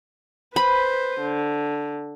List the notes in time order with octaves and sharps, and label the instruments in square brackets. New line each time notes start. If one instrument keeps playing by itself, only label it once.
[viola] B4 C5 [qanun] B5
[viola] D3